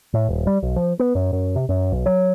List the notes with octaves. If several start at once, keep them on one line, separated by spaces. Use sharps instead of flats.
A2
D#1
G3
B1
F3
B3
F#2
F#2
C3
F#2
B1
F#3